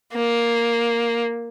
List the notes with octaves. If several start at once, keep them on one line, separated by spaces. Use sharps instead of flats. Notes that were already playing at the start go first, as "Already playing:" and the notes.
A#3